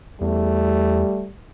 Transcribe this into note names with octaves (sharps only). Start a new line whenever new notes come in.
E2 G3 A3